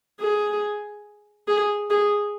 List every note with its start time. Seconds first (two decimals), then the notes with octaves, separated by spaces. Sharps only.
0.21 G#4
1.48 G#4
1.90 G#4